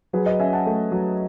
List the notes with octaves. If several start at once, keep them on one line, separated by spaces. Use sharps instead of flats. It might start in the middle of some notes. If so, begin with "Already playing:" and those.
F#3 G#4 B4
B4 D#5
C#4 E5 G#5
F#5 A5
A3
F#3